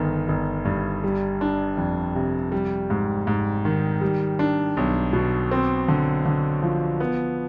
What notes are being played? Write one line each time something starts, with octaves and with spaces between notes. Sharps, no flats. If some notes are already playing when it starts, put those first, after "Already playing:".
Already playing: G1 D#3
G1
G2
G3
D4
F2
C3
G3
G#2
G#2
D#3
G3
D4
B1
B2
C4
D3
D3
F3
B3